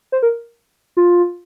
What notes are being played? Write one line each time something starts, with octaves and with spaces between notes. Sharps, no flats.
C5
A#4
F4